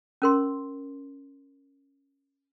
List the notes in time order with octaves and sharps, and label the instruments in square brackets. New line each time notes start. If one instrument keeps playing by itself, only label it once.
[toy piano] C#4 A#4 C6